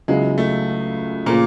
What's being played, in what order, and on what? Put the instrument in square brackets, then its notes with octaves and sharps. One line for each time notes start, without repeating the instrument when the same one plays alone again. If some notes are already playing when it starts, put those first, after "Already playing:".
[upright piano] C#2 C#3 F#3 B3 E4 [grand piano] G#3
[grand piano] A3
[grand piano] A#2 A#3 [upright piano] C#3 F3